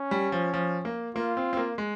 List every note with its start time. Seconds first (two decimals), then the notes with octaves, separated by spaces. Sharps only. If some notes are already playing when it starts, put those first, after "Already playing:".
Already playing: C#4
0.11 G3
0.32 F3
0.54 F3
0.85 A#3
1.15 A#3 F4
1.37 C4
1.53 C4
1.57 A#3
1.78 G#3